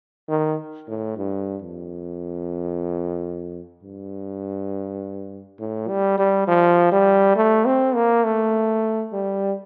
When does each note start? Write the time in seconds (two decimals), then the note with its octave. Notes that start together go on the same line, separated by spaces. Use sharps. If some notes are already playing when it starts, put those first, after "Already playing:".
0.29 D#3
0.88 A2
1.17 G2
1.62 F2
3.83 G2
5.60 A2
5.88 G3
6.18 G3
6.48 F3
6.92 G3
7.36 A3
7.65 C4
7.95 A#3
8.24 A3
9.13 G3